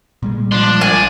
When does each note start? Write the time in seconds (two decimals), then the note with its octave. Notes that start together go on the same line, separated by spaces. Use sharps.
0.23 A#2 G3 G#3
0.52 F3 D4 C6
0.81 A1 G#5